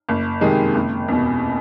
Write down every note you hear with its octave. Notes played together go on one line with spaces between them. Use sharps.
F#1
F2 C3 D#3 G#3
F#1
E2 B2